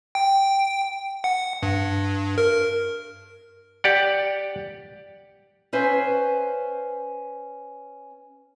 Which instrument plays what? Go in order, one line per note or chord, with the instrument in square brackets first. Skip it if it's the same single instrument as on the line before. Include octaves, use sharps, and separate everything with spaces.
[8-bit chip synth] G5
F#5
G2
A#4
[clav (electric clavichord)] G4 D5 F#5
[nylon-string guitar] C#4 B4 C5 E5